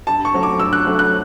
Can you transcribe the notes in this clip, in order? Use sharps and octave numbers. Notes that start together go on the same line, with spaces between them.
G2 A5
C#6
F#3 A3 C#4
D6
G2 E6
F#6
F#3 A3 C#4
F#6